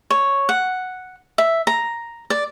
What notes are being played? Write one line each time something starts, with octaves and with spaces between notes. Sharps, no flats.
C#5
F#5
E5
A#5
D5